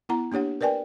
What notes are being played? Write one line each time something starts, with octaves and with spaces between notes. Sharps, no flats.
B3 E4 F#5 A#5
A#3 D4 G4 C#5 F#5
A#4 B4 D5 G5 G#5